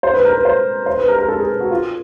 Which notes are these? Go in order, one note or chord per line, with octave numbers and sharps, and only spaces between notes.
C5
B4
A#4
B4
C5
C5
B4
A#4
A#4
A4
G#4
F#4
F4